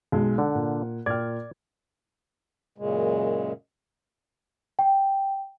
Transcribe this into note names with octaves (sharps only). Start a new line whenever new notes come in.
B1 G#3
D3 F#5
A#2
A#2 D5 G5 F6 G#6
F#2 A#2 C#3 G#3
G5